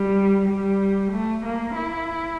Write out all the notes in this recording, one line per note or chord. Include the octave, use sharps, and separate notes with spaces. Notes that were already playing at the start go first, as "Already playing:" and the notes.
Already playing: G3
G3
A3
A#3
E4